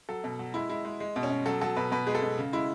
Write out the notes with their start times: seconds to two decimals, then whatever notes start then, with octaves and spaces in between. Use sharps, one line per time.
0.09 F#3 A4
0.24 B2
0.39 F#3
0.54 G#3 E4
0.69 G#3 E4
0.85 G#3
1.00 G#3
1.16 B2
1.23 C#4
1.31 B2
1.46 F#3 A4
1.61 F#3 A4
1.76 B2 B4
1.92 B2 B4
2.07 G#3 G#4
2.15 A4
2.22 B2
2.38 C#3
2.53 G#3 E4